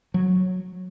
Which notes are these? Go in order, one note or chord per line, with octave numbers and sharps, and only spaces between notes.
F#3